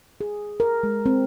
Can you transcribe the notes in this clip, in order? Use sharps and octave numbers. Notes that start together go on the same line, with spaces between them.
G#4
A#4
G#3
C4